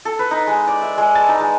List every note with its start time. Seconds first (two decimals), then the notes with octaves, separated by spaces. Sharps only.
0.05 A4
0.19 B4
0.31 D#4
0.47 G#3
0.67 D5
0.82 E5
0.98 G#3
1.15 A5
1.28 D#4
1.40 G#3